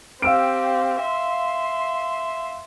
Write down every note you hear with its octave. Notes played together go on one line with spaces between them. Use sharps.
C4 G4 F5 E6 D7
E5 C6